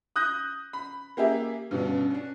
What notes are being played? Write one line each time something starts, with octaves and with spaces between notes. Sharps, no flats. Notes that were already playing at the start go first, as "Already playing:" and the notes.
D#6 F#6 G6 A#6
B5
A#3 G4 G#4 E5
G2 B2 D3 C#4
C#4 D4